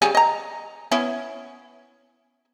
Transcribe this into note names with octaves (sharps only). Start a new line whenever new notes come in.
C#3 G3 G#5
D#5 A#5
B3 C#4 E4